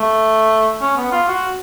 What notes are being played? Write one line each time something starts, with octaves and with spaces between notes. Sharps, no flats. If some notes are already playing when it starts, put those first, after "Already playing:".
Already playing: A3
C#4
B3
F4
F#4